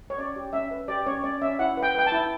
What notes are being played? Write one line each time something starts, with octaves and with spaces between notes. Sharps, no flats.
C#5
C#4 D5
G4
C#4 E5
B4
G4 D5
C#4 C#5
C#4 D5
C#4 E5
E4 F#5
B4
G5
B4 G5
A5
E4